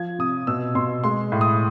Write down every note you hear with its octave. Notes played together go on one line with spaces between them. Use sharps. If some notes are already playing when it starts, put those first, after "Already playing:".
Already playing: F3 G#6
C3 D#6
B2 E6
B2 C6
G#3 C6
A2
D#6